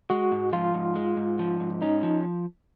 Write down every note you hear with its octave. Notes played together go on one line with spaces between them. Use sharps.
G#3 F#4
G#2
F3 F4
G#2
G#3
G#2
F3
G#2
C#4 D#4
F3